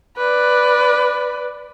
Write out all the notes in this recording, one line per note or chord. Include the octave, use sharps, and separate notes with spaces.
B4 D5